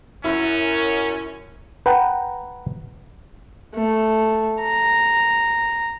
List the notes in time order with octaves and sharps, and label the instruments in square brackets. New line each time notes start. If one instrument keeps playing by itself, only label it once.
[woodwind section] F#2 [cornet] C#4 [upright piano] E4
[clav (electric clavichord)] B4 F#5 G5 A#5
[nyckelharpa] A3
A#5